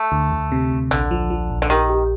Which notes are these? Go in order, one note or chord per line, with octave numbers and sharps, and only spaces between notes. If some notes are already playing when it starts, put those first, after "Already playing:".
Already playing: A3
D2
D2
C3
D2
A#1 D3
F3
F3
A#1
D3
D#3 G4
G4